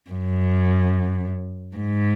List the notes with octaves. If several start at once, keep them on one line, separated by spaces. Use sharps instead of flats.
F#2
G#2